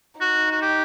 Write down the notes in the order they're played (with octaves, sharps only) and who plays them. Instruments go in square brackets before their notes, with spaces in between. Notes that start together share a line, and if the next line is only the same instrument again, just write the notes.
[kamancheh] D#4 [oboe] F#4
[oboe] F#4
G4